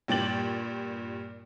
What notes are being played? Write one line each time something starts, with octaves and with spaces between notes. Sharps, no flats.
G2 A#2 G5 A6 F#7